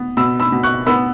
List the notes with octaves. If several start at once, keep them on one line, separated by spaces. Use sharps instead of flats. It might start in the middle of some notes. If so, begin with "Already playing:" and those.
Already playing: B3
B2 B5 E6
B5 E6
B2
C#6 F#6
B3 B5 E6